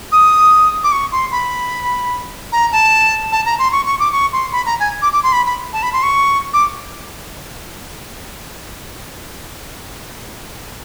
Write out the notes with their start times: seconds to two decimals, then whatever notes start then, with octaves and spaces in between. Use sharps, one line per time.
0.12 D#6
0.84 D6
0.92 C#6
1.12 C6
1.32 B5
2.52 A#5
2.72 A5
3.32 A5
3.46 A#5
3.59 C6
3.72 C#6
3.86 C#6
4.00 D6
4.12 C#6
4.33 C6
4.52 B5
4.66 A#5
4.80 G#5
5.02 D6
5.13 D6
5.23 C6
5.33 B5
5.46 B5
5.73 A5
5.83 B5
5.93 C6
6.03 C#6
6.54 D6